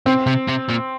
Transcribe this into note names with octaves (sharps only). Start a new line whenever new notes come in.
C3 C4
C3
C3
A#2